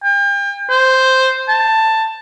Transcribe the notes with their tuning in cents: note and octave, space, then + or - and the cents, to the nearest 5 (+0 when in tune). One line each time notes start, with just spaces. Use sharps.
G5 +40
C5 +0
A5 +10